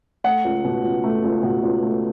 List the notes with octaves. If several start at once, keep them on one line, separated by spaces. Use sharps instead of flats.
A3 F#5
C#2
B2
C#2
A3
C#2
B2
C#2
A3